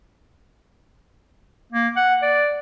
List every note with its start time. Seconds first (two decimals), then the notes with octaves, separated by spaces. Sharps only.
1.72 A#3
1.96 F#5
2.22 D5